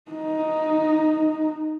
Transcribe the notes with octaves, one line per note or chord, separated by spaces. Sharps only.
D#4